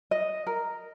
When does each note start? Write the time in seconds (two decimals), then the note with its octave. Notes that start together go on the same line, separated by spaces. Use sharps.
0.11 D#5
0.47 A#4